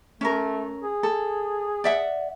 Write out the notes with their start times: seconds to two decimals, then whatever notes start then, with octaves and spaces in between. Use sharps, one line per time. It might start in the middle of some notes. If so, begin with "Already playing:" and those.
0.21 A3 C#4 A#4
0.83 G#4
1.03 A4
1.84 D5 E5 F#5